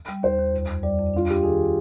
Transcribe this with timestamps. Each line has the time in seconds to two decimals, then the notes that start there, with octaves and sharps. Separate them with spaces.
0.09 G3
0.23 D#2 C5
0.39 D#2
0.53 F2
0.69 F2
0.83 G3 D5
0.98 F2
1.14 D4 F4
1.29 D4 G4
1.43 D#3 G#4